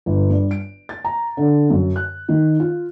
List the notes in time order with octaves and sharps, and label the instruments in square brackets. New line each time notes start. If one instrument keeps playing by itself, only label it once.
[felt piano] G1
G2
D7
A6
A#5
D3
F#2
F#6
D#3
F4